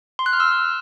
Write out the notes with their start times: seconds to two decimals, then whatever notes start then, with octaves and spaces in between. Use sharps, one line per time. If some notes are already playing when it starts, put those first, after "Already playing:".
0.19 C6
0.26 F#6
0.33 F6
0.40 E6